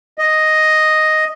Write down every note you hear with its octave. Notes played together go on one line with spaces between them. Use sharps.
D#5